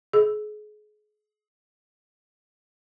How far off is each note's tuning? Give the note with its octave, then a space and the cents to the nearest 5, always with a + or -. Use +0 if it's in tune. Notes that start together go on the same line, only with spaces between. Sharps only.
G#4 +30